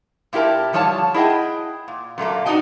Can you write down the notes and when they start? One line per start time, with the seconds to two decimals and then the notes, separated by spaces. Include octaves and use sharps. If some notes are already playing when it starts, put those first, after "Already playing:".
0.33 A#2 E4 G4 A#4 A5
0.73 D3 F3 G3 F4 C#5 A5
1.14 E4 G#4 D#5 F#5 G5
1.88 A#2
2.18 F#2 A#2 A3 A#3
2.46 D4 D#4 F#4 D5 D#5 G5